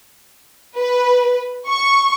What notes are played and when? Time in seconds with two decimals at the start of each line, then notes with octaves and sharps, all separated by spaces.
0.77 B4
1.68 C#6